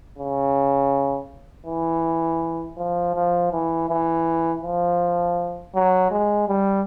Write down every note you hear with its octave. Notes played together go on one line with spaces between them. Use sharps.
C#3
E3
F3
F3
E3
E3
F3
F#3
G#3
G3